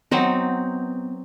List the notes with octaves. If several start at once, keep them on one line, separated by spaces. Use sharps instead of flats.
F#3 B3 C4 D#4